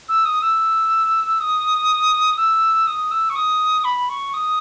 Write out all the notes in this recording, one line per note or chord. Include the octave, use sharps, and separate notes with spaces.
E6
D#6
E6
D#6
E6
D#6
E6
C#6
D#6
B5
C#6
D#6